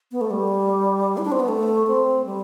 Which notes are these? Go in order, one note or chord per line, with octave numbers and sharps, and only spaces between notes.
B3
A3
G3
E4
D4
C4
B3
A3
C4
G3